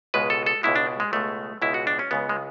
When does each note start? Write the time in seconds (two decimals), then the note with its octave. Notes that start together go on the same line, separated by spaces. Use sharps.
0.14 C#2 B2 G#3 B4
0.30 A4
0.46 A4
0.63 C#2 B2 G#3 E4
0.76 D4
1.00 G#3
1.13 C#2 B2 G#3 A3
1.62 C#2 B2 G#3 E4
1.74 F#4
1.87 D4
1.99 C#4
2.11 C#2 C#3 G#3 B3
2.29 G#3